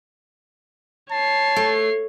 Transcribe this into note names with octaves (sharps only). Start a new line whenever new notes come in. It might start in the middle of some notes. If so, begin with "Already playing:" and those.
C#5 A5 C7
A3